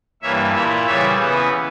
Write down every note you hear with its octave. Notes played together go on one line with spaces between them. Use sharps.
G2 E3 A#3 C#5 E5
A#2 A#3 E4 C#5 E5
C#3 E3 G3 C#5 E5
C#3 E3 B3